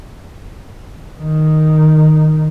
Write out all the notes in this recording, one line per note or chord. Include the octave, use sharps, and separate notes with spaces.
D#3